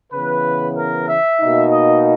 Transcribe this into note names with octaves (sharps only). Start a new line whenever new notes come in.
C#3 E3 B3 B4
A#4
E5
B2 A#3 D#4
D#5